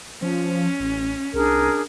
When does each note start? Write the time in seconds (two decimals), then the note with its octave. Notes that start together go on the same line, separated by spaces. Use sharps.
0.22 F3 C#4
0.80 A1
1.34 C2 D4 G#4 A#4